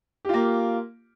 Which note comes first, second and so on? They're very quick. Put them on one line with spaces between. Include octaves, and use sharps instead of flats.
G4 F4 A#3